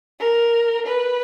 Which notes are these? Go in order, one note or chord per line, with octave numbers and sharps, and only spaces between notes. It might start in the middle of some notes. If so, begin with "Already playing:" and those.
A#4
B4